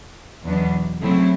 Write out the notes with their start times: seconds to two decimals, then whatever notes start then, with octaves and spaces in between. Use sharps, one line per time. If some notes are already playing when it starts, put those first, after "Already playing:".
0.44 E2 B2 F#3 B3 D4
1.01 C#3 F#3 A3 C4 E4